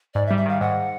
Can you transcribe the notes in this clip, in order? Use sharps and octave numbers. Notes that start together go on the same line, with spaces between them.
G#2 D5
E5
G3
E5
D#3 F5
G#2 F#5